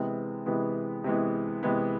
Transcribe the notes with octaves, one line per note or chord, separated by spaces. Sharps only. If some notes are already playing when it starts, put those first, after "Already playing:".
Already playing: C3 E3 G#3 B3
C3 E3 G#3 B3
C3 E3 G#3 B3
C3 E3 G#3 B3